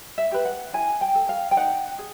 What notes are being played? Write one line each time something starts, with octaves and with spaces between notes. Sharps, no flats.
E5
G4 B4
F#5
E4 G#5
G5
A4
F5
G5
D#4 F#5
G#4